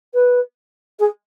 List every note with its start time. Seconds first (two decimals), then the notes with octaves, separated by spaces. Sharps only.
0.14 B4
0.99 G#4